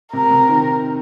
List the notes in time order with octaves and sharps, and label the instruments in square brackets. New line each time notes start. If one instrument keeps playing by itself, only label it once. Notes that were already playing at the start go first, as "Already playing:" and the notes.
[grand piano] C3 [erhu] A#4
[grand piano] C3
D#3